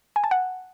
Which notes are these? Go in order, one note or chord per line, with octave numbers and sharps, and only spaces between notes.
G#5
A5
F#5